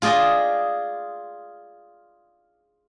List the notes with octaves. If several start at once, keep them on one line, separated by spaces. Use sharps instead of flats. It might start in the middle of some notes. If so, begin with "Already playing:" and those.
F4 G#4 D5 D#5 G5